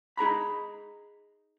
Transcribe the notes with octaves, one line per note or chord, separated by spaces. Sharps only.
D#4 G#4 A#5 B5